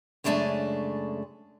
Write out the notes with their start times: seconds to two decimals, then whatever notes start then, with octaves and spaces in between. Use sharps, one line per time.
0.24 F#2 C#3 G#3 A3 D4 G#5